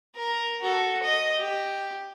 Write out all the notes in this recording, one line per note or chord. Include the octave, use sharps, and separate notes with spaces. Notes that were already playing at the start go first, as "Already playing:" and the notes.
A#4
F#4 A4
D#5
G4